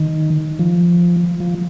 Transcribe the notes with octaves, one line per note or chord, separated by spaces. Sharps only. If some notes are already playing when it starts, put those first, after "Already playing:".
Already playing: D#3
F3
F3